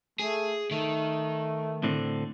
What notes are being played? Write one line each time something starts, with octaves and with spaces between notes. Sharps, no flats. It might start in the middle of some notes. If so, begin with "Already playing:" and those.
A3 G#4
D#3 A3
A2 D3 C4